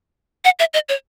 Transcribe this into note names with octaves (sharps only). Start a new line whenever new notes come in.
F#5
E5
D#5
C#5